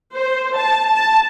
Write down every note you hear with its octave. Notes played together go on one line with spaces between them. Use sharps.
C5
A5
A5